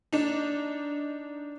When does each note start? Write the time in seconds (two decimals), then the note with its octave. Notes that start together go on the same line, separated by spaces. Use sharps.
0.13 D4 D#4